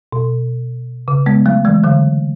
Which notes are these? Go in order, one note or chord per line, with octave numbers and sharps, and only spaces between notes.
B2
C#3
G#3 B3
F#3 A3
E3 G#3
D3 F#3